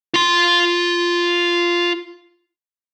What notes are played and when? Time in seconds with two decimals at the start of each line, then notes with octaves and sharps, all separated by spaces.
0.14 F4 C6